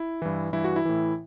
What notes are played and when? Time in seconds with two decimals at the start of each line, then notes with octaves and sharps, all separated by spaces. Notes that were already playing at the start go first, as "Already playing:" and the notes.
Already playing: E4
0.22 G2 E3
0.53 G2 E3 E4
0.64 F#4
0.76 E4
0.85 A2 E3